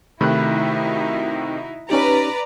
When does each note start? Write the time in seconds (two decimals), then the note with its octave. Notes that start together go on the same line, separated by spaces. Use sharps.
0.21 C3 D#3 A3 D#4 E4 F#4 B5 F#6
1.90 C#4 D#4 G4 B4 D5 A#5